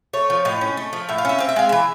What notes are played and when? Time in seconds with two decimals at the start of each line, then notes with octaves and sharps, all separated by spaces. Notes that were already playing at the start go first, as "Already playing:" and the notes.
0.13 A3 C#5
0.30 F3
0.45 A2 D#5
0.61 C#4
0.77 A3
0.93 F3
1.09 A2 E5
1.18 F5
1.25 C#4 E5
1.38 C4 F5
1.49 E5
1.56 G#3 F5
1.69 E3 E5